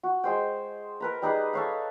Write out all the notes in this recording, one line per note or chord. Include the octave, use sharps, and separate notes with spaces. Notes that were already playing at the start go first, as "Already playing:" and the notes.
F#4
G#3 C5 G5
A#4 B4 A#5
G3 D#4 G#4 B4
A4 C#5 F5